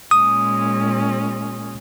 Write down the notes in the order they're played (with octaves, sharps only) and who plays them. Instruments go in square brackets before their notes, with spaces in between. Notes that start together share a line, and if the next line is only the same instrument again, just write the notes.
[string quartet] A#2 G#3 C#4 [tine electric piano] D#6